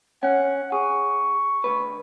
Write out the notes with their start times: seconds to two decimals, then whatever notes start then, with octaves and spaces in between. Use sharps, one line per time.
0.23 C#4 F#5
0.72 G#4 C#6
1.64 D2 B4